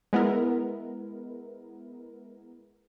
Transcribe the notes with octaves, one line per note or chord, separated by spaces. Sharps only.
G#3 B3 E4 A#4